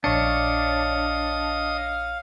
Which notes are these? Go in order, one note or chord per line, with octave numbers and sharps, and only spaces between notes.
A#1 D4 C#5 D#5 F5 D#6 C#7